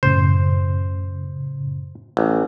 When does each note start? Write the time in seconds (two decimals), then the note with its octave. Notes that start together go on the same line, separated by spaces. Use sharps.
0.03 F#2 A2 C#3 C5
2.17 A1